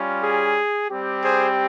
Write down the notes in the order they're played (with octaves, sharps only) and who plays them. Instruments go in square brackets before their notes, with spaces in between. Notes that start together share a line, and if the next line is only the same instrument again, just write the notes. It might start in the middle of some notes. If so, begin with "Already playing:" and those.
Already playing: [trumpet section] G3 C#4 F4
G#4
G3 C4 G4
G#4 C5